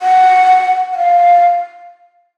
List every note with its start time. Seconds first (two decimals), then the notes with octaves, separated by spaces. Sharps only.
0.02 F#5
0.93 F#5
0.98 F5